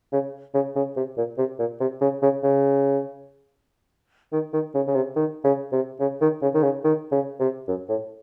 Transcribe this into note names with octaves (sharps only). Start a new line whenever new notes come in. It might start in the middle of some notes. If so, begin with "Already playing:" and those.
C#3
C#3
C#3
C3
A#2
C3
A#2
C3
C#3
C#3
C#3
D#3
D#3
C#3
C#3
C3
D#3
C#3
C3
C#3
D#3
C#3
D#3
C#3
D#3
C#3
C3
F#2
A2